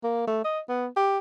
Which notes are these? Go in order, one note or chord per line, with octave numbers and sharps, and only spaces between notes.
A#3
A3
D#5
B3
G4